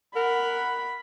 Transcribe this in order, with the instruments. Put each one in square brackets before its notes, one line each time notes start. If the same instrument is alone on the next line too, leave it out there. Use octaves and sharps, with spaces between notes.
[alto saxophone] A#4 [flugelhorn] F#5 [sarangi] B5